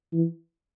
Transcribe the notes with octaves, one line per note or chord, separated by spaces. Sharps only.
E3